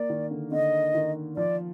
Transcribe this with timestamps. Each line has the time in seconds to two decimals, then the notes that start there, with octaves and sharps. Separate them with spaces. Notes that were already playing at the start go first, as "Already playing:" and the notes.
Already playing: A#3 D5
0.10 D#3
0.31 D3
0.52 D3 D#5
0.95 D#3
1.37 F3 D5